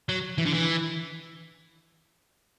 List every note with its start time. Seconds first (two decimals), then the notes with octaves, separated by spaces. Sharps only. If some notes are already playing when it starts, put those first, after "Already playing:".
0.09 F#3
0.38 E3
0.46 D3
0.54 E3